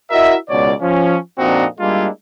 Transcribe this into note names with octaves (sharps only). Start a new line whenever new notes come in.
E4 F#4 A#4 D#5 E5
C#2 B2 C#5 D5
F3 C#4
F2 A#2 C4 D4 D#4 F#4
G3 G#3 A#3 D4 E4 F4